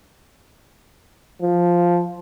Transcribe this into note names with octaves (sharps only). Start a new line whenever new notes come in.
F3